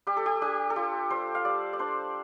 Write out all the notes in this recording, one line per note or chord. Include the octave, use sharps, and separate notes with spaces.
G3 G4
A4
G4
D4 G4
A4
F4 G4
G3 C5
F5
G3 D5
D5
D4 C5